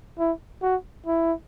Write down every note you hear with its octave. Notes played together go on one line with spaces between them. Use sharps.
E4
F#4
E4